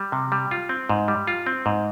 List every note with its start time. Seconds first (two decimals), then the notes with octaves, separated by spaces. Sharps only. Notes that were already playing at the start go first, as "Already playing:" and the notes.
Already playing: G3
0.12 C3
0.32 G3
0.51 F4
0.69 C4
0.90 G#2
1.08 G3
1.27 F4
1.47 C4
1.66 G#2